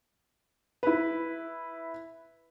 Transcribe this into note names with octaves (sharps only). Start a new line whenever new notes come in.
E4 B4